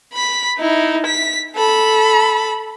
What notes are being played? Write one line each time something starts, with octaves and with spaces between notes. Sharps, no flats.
B5 B6
D#4 E4
B6
A4 B5